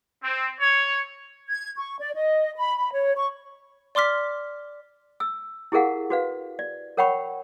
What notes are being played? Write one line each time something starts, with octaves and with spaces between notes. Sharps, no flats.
C4
C#5
G#6
C#6
D5
D#5
B5
B5
C#5
C#6
D5 C6 D6 F6 B6
E6
E4 G4 G#4 A#4 F5 F#5
F#4 B4 F5
D5
A#4 C#5 F#5 G5 B5 C#6